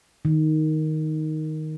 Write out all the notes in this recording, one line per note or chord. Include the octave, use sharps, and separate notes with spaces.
D#3